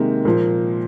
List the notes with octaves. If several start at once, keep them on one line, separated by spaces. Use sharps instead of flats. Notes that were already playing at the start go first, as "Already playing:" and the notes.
Already playing: C3 D#3 G#3 A#3
A#2 F3